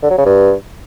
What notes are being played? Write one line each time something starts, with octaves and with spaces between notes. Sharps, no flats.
D3
F#3
C#3
G2